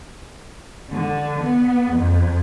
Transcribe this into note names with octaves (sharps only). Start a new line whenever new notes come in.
D3
B3
F2